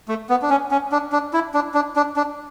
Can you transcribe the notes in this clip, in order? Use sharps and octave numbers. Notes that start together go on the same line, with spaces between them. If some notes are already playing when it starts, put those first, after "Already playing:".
A3
B3
D4
C#4
C#4
D4
D4
E4
D4
D4
D4
D4